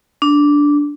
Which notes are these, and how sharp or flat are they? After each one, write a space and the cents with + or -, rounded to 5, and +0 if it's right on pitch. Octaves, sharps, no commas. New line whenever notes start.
D4 -10